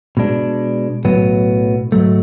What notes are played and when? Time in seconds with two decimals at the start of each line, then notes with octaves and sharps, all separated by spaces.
0.17 B2 G#3 D4
1.05 B1 A2 F#3 B3
1.92 G#2 F#3 A3